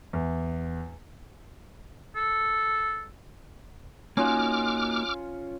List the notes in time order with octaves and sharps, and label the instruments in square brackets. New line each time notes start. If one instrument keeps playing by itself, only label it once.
[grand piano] E2
[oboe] A4
[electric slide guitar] A#3 D#4 F#4 [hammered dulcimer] C#4 F4 [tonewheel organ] D6 F6